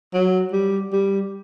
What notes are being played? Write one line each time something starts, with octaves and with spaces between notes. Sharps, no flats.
F#3
G3
G3